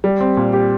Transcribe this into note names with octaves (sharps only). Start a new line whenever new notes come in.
G3
C4
A#2
G4